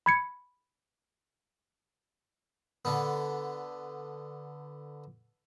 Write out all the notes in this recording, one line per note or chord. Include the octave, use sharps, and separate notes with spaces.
B5 G#6 C#7
D3 B3